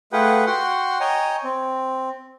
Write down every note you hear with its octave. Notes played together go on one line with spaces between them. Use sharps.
A3 F4 G#4 B4 F#5 G5
F#4 F#5 G5 C6
C#5 D#5 G5 G#5 A#5
C4